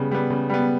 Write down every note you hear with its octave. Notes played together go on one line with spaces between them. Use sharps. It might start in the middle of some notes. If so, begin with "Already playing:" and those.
Already playing: C#3 G3 B3
G3 B3
C#3
G3 B3